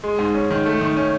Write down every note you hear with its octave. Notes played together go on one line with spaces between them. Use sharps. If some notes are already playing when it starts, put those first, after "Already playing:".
G#3
G#2
C#4
D#3
A3
D#3
C#4